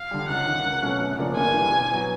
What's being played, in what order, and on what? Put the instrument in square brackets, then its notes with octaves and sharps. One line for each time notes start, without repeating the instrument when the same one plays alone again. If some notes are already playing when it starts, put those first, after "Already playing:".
Already playing: [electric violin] F5
[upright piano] D3 G3
[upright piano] C#2 [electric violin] F#5
[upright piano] C3 D#3
C#2
B2 F#3 A3 C#4
F#2
C#3 F3 A#3 D4
[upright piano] G1 [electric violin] G#5
[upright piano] G2 E3 G3
B2
F#3 B3